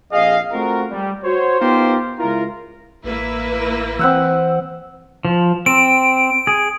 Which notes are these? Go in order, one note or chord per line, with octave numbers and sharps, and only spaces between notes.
A#1 F2 G#4 D#5 F5
A3 C4 F4 F#4 A#4
G3
F#4 C5 C#5
B3 D#4 F4 G4 A#4 C5
C#2 E4 F4 A#4
A1 A#3 E4 B4
E3 C4 F#5 E6
F3
C4 D7
G#4